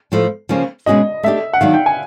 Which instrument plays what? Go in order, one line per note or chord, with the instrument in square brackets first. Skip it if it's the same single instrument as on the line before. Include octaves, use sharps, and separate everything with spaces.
[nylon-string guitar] A2 F3 A3
C#3 F3 A#3 C#4
[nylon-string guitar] B2 G#3 C#4 F#4 [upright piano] D#5
[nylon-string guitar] A3 D4 G4 [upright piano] E5
[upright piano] F#5
[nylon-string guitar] D#3 F#3 A#3 D4 [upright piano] F5
[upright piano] G5
G#5